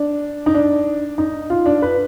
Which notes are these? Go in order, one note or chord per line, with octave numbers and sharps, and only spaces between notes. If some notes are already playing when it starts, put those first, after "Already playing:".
Already playing: D4
D#4
D4
D#4
F4
D4
B4